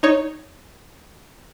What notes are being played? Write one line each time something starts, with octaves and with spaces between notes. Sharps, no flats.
D#4 C#5